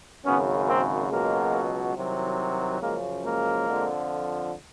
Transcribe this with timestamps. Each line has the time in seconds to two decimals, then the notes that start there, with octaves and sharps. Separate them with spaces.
0.24 G#1 F#2 C#3 B3 C#4
0.67 A#3 C4
1.10 C#2 B2 F#3 G#3 A#3
1.96 C2 C3 D#3 F#3
2.81 F#2 C#3 F3 G#3 A#3
3.23 G#3 A#3
3.67 F2 D3 F3